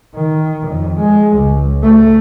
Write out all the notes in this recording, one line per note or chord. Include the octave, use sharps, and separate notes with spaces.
D#3
F2
G#3
C#2
A3